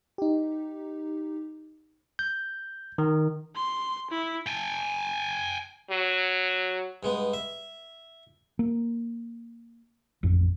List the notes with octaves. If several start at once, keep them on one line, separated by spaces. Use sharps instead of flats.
D#4 G4
G6
D#3
C6
E4
G5 G#5
F#3
G2 G#3 B3
E5
A#3
A1 F2